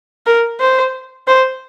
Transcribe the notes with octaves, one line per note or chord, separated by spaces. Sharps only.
A#4
C5
C5